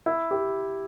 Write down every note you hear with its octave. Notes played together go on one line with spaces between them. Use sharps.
E4
G4